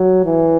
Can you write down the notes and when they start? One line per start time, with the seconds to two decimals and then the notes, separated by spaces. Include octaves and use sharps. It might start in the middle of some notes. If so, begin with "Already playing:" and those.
Already playing: F#3
0.25 E3